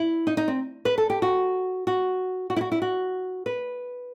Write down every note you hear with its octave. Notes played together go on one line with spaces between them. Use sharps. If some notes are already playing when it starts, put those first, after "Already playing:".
Already playing: E4
D#4
D#4
C4
B4
A4
G4
F#4
F#4
F#4
E4
F#4
E4
F#4
B4